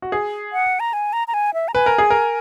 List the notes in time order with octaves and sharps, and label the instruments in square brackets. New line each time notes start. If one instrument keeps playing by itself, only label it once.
[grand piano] F#4
G#4
[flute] F#5
A#5
G#5
A#5
A#5
G#5
E5
A#5
[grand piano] B4 [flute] G#5
[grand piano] A#4
G#4
A#4